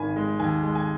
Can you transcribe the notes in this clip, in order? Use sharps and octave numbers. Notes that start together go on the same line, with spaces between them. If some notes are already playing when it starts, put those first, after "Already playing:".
Already playing: G#1 D#3 G#5 B5
G#3
D#2 G#5
G#3
G#5